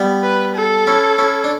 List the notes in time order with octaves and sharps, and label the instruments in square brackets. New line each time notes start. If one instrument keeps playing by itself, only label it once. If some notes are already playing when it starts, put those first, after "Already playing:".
Already playing: [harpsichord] G3 B3
[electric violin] B4
A4
[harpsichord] C#4 E4
C#4 E4
D4